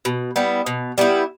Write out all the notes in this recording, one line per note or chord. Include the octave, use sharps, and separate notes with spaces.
B2
G3 B3 E4
B2
G3 B3 E4